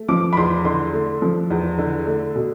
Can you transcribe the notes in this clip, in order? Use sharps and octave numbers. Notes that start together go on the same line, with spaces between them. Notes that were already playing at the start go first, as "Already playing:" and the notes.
Already playing: A3
F3 D6
B5
E2 C6
D3 C6
A3
F3
E2
D3
A3
B2